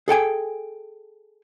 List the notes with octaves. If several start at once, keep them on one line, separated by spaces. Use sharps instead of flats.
G#4 A4 G5 G#5